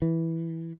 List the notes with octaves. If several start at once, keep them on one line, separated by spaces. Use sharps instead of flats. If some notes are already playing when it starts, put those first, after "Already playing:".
E3